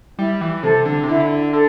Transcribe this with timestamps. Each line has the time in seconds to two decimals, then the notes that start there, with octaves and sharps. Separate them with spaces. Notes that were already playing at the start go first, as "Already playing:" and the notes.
0.18 G3 E4
0.41 E3
0.63 C3 A4 C5
0.85 D3
1.03 C3
1.08 D3 E4
1.53 D3 A4